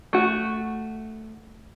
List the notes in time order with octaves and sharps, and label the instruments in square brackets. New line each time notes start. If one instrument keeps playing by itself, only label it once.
[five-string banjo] A3 F#4